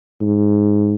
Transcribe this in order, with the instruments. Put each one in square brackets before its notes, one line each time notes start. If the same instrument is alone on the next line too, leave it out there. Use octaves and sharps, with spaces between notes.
[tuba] G#2